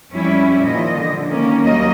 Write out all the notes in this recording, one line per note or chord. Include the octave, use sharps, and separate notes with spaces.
F2 G3 C#4 E4
A#2 D#3 F3 D#5
D3
D#3 A#3 C#4
D#2 F#3 G3 A#3 D#5